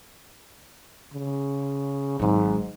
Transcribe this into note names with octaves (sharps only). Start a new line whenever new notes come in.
C#3
G#1 G#2 F#3